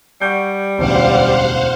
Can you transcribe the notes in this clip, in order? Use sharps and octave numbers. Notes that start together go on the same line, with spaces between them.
G3 F#5 C#6 G6
E1 A1 D2 C5 F5 F#5